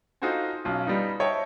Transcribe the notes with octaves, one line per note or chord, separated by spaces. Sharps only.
D#4 F4 F#4 A4 C5 G#5
B1 C#4 F4
G3 B3 D#4 F4
C#5 D#5 E5 G5 A5